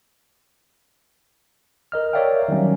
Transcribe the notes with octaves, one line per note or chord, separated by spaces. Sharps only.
A#4 D#5 F6
A#4 C#5 D5 E5 F5 G5
D#3 F#3 G3 C#4